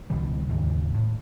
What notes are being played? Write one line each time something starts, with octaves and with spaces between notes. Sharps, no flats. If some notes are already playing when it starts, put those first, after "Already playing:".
C#2 B2 D#3 G3
D#2 G#2 C#3
A2